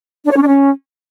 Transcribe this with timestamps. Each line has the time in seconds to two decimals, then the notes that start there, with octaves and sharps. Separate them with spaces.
0.24 D4
0.30 C#5
0.36 C#4
0.41 D4
0.47 C#4